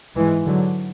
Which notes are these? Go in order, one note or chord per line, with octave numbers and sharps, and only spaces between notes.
G#2 E3 G#3
D3 F#3